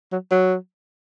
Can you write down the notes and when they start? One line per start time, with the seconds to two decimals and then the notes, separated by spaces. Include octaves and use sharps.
0.12 F#3
0.31 F#3